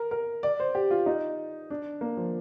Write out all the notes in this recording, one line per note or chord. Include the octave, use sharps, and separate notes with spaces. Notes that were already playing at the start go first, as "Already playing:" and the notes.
Already playing: A#4
A#4
D5
C5
G4
F4
D#4
D4
A#3
F3